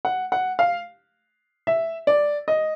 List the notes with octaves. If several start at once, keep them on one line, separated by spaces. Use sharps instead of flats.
F#5
F#5
F5
E5
D5
D#5